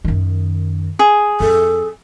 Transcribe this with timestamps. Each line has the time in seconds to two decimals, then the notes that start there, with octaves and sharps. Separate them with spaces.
0.04 F#2 D#3
0.99 G#4
1.40 F2 A4